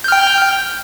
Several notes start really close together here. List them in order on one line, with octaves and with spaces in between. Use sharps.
G6 F6 G5